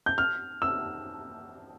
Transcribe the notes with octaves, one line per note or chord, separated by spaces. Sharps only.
G6
F6
E6